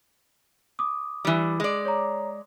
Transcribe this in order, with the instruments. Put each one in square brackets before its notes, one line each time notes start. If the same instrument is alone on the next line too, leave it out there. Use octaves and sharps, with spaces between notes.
[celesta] D6 D#6
[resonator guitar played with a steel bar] E3 G3
G#3 D5
[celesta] C#5 A#5